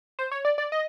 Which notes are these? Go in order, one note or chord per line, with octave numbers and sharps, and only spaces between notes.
C5
C#5
D5
D5
D#5